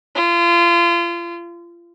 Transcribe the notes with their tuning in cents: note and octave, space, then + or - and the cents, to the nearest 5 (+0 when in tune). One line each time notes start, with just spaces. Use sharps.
F4 -30